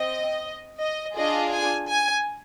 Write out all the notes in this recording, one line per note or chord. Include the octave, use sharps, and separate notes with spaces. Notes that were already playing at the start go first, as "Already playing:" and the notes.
Already playing: C4 D#5
D#5
D4 F4 G#4 D#5
G#5
G#5